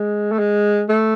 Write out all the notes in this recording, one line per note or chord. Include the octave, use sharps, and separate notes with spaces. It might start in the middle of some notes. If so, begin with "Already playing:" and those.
Already playing: G#3
A3
G#3
A3